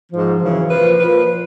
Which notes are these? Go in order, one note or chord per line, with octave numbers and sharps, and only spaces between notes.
G#2 F3
F#2 C#3 E3
A#2 F3 B4
A#2 F3 B4